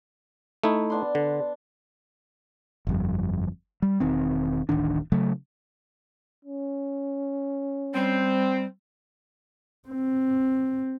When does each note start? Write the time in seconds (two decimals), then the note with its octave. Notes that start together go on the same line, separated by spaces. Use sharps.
0.64 A3 D#4 E4
0.90 B3 D4 C6
1.15 D3
2.87 G1 F2 G3
3.82 G3
4.00 E1 D#3 C4
4.69 D1 A1 D#3 D4
5.12 C#3 F#3 A3
6.45 C#4
7.94 G3 C4
9.89 C4